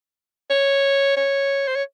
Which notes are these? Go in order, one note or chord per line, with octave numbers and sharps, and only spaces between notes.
C#5
C#5
C5
C#5